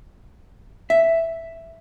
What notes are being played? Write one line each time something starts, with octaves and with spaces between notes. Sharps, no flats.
E5